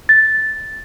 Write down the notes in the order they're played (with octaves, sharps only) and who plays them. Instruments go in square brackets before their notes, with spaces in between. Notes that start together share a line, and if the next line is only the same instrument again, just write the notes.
[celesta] A6